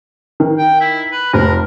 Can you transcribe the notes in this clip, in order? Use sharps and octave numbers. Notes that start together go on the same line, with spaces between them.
D#3
G5
E4
B4
F1 A#4